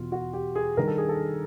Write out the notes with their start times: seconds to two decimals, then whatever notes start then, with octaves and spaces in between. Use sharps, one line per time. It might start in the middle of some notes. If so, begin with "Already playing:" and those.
Already playing: E2 B2 F4
0.12 F#4
0.33 G4
0.55 G#4
0.77 G2 D#3 A#4
0.87 A4
0.98 G#4
1.09 A4